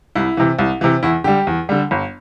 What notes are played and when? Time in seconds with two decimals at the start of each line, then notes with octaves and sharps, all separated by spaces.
0.15 C2 E4
0.37 C3 E3
0.59 C2
0.81 C3 E3
1.03 E2 E4
1.24 D3 G3 G4
1.47 E2
1.69 D3 G3
1.91 G1